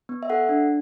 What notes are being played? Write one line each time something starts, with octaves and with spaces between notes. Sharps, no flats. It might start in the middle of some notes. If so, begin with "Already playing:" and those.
B3
E5
A4 F#5
D4